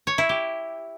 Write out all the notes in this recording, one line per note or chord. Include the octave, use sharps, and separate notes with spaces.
C#5
E4
G4